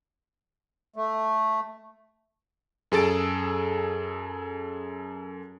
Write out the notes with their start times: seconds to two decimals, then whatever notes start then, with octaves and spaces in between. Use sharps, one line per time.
0.96 A3
2.92 F#2 G#4 A4 A6 D7